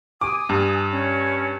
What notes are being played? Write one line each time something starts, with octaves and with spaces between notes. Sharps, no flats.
G#5 D6 D#6
G2
C#4